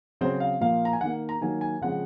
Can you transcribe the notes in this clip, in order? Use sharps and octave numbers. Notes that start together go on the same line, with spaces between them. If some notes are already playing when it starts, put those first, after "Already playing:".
C#3 F#3 C4 C5
F5
A#2 F3 A#3 F5
A#5
G#5
D#3 A#3 F#5
A#5
D#3 F#3 A#3 G#5
G#5
C#3 F3 G#3 C4 F#5